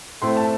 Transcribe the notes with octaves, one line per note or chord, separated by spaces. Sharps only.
A2 A3 C4 E4 C6
A5